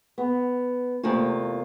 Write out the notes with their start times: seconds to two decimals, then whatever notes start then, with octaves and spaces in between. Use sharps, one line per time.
0.18 B3
1.03 E2 C3 A3 A#3 F4